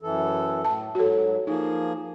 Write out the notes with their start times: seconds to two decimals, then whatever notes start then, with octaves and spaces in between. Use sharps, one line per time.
0.02 F#2 E3 A4
0.64 A2 A5
0.95 G#2 F#3 F#4 A4
1.47 F3 A#3 D#4 G#4